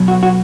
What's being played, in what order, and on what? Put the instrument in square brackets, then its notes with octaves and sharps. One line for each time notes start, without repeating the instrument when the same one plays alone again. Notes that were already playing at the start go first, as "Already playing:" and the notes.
Already playing: [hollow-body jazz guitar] B1 B2 F#3
F#4
F#4